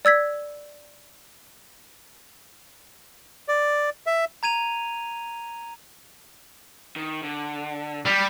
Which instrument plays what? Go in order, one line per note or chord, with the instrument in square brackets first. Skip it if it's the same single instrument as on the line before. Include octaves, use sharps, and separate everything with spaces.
[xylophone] D5 E6 G#6 B6
[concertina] D5
E5
[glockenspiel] A#5 G#6 D#7 F7
[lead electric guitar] D#3
D3
[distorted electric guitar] G3